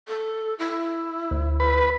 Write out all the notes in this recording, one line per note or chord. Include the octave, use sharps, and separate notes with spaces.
A4
E4
D2
B4